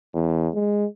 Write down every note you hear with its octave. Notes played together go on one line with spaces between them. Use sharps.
E2
G#3